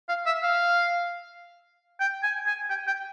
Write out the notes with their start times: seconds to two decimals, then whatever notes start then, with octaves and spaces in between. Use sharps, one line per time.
0.09 F5
0.26 E5
0.43 F5
2.00 G5
2.23 G#5
2.47 G#5
2.70 G5
2.87 G5